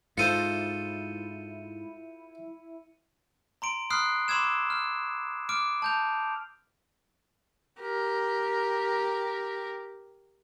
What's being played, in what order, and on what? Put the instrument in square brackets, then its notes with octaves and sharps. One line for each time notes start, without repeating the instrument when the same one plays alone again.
[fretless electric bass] G#2 [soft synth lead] E4 [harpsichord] F4 A4 C5 [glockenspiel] C#7 D#7
[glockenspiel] A#5 C6 D7
B5 C6 D#6 F6 F#6 C7
B5 C6 D6 E6 G#6 E7
F6
D6 F6 D7
A5 G6 F7
[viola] G4 A#4